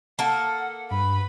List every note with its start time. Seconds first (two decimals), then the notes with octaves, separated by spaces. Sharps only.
0.19 A#3 A4 F#5
0.91 G2 B4 B5